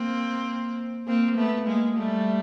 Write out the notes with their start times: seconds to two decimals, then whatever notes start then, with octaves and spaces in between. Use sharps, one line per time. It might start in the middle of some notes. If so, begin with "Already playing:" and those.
Already playing: A#3 C4
1.07 A#3 C4
1.37 A3 B3
1.67 G#3 A#3
1.97 G3 A3